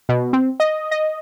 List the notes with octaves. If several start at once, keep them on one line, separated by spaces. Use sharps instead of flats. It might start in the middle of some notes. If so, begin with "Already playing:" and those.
B2
C4
D#5
D#5